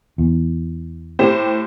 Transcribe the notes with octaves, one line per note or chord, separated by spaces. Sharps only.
E2
A2 G4 C5